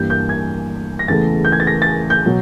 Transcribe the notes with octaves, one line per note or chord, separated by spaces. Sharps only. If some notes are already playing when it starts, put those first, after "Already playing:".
Already playing: G2 E3 G3 A#3 G6
G6
G#6
A#6
E2 C#3 E3 A3 A6
G6
G#6
A6
A#6
A6
G6
B2 F#3